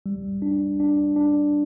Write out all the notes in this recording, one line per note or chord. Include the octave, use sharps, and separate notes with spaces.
G3
D4
D4
D4